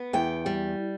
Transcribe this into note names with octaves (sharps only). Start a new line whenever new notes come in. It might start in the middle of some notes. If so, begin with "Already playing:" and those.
Already playing: B3
E2 G5
G3